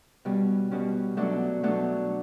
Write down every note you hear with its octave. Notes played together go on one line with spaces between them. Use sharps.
B2 G3 C#4
B2 G3 C#4
B2 F#3 A3 D4
B2 F#3 A3 D4